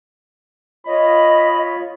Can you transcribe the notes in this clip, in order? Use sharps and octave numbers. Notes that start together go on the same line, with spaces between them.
F4 C#5 D#5 B5